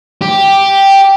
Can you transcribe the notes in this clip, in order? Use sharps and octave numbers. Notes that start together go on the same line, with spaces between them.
G4